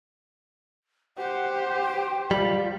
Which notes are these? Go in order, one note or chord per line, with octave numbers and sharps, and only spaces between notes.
G4 C5 F#5
G5
G3 F4